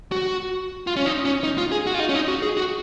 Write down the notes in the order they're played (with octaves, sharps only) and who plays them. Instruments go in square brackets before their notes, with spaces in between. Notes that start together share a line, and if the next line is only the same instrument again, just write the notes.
[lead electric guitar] F#4
F4
C#4
D#4
C#4
D#4
F4
G#4
F#4
F4
D#4
C#4
D#4
F#4
G#4
F#4